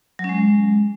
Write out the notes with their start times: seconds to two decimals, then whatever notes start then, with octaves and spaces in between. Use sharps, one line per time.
0.19 F#3
0.24 C#4
0.29 G#3